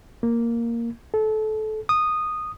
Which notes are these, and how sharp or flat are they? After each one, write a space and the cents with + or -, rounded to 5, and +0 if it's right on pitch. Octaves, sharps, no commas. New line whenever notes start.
A#3 +0
A4 -25
D#6 -10